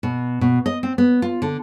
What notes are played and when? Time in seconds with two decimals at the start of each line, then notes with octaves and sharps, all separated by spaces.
0.03 B2
0.41 B2
0.66 D#5
0.83 C4
0.98 B3
1.22 F4
1.42 D3